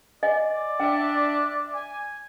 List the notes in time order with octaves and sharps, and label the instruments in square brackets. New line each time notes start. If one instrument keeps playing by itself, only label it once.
[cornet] D5 [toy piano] D#5 G#5
[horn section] D4 E5 [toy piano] G5
[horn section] G#5